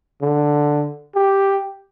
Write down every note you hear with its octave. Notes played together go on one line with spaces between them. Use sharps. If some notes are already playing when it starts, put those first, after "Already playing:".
D3
G4